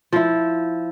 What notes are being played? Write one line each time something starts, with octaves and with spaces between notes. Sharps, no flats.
F3 E4